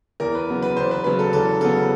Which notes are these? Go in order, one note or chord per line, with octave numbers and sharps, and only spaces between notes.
E2 A#4
B4
C#3 F#3 B3
B4
E2 C5
B4
C#3 F#3 B3 B4
A4
E2 A4
C#3 F#3 B3 A4